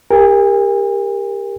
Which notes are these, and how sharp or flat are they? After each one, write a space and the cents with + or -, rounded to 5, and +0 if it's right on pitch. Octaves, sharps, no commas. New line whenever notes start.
G4 +25 A#4 +0 G#5 -45